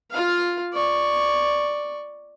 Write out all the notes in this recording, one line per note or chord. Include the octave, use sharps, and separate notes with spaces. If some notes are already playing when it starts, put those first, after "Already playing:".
F4 F5
D5 C#6